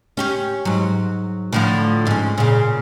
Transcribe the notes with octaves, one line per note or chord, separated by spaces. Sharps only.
C#4 G4 C#5
G#2 F#3
A2 D3 F3
G#2 C#4
A#2 C#3